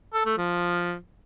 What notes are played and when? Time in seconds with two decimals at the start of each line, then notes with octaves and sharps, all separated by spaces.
0.14 A4
0.26 A3
0.38 F3